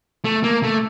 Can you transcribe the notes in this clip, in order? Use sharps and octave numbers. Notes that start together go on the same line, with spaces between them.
A3
A#3
A3